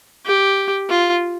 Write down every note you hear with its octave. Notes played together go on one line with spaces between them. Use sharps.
G4
F4